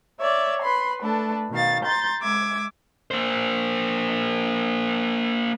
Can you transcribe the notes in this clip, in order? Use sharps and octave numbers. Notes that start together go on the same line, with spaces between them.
C#5 D5 E5
B4 B5 C6
A3 D4 A4 B4
B2 D#3 F5 A6
A#5 C6 G6 A6
G#3 E5 D6 G#6
A#3 C5